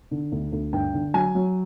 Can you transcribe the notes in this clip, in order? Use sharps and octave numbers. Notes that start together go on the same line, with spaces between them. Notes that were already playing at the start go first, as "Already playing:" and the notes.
D3
D2
D2
G2 G5
D3
F#3 G#5
F#3